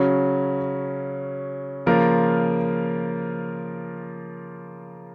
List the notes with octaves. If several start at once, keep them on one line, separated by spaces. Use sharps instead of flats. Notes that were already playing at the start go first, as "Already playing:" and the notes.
Already playing: C#3 F#3 C#4
C#3 F3 A#3 F4 A#4